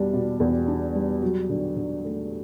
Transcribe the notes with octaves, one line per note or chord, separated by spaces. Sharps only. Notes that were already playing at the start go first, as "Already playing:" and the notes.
Already playing: E2 B2 G3 D4
B2
E2
D4
G3
F#3
D3
D3
A3